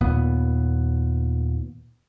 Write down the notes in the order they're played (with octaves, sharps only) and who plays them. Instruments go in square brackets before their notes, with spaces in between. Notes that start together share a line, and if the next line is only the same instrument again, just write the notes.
[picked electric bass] D#2 A#2 B3